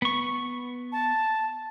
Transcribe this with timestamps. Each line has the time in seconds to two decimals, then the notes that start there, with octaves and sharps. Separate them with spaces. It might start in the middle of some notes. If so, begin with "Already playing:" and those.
0.02 B3 C#6
0.92 A5